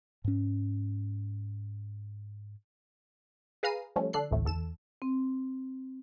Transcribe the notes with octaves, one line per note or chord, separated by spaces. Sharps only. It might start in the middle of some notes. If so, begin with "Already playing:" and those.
G#2 C#4
G#4 B4 F5 A#5 C7 D#7
F3 G3 A3 C#4
D3 D4 A4 F#6 C7
A1 D2 A2 A3
E2 A4 E7
C4